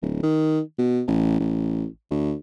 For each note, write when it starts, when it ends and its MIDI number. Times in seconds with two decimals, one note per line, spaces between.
0.02 0.21 26
0.23 0.60 51
0.79 1.02 47
1.08 1.37 33
1.40 1.86 33
2.11 2.34 38